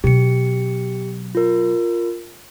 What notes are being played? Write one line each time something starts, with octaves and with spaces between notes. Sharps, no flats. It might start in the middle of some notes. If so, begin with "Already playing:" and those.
B2 F#3 G4 C#7
F4 A#4